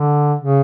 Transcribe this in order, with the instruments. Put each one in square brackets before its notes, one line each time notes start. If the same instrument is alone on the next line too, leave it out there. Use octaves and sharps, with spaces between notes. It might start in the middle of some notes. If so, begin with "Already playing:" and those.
Already playing: [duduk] D3
C#3